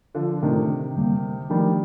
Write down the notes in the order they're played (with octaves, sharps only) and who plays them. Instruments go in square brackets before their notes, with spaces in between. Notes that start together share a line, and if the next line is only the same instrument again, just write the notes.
[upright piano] D3 F3
[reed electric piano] A2 A3 D4 [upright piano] C3 D#3
[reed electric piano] F2 D3 G3 A#3
[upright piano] D#3 G3 [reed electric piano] F3 A3 D4